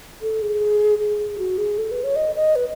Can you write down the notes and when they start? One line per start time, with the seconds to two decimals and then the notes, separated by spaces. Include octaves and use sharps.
0.22 A4
0.42 G#4
1.00 G#4
1.38 F#4
1.58 G#4
1.78 A4
1.91 B4
2.04 C#5
2.16 D#5
2.36 D#5
2.56 B4